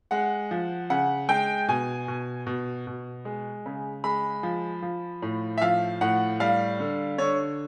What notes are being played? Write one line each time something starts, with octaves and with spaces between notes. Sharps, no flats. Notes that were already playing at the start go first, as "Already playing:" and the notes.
G#3 F#5
F3
C#3 F#5
G#3 G5
B2 G#5
B2
B2
B2
G#3
C#3
G#3 B5
F3
F3
A2
E5
F3 F5
A2 F#5
G3 F5
D3
D3 C#5